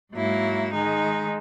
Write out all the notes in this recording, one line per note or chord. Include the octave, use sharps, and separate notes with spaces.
G#2 F#3 A#3 E4
D#3 G#3 D#4